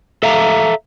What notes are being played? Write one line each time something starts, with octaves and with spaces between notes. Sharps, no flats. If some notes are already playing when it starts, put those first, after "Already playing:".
A4 E5 F5 A#5